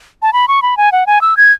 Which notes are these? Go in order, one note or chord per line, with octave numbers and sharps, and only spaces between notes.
A5
B5
C#6
B5
G#5
F#5
G#5
E6
G#6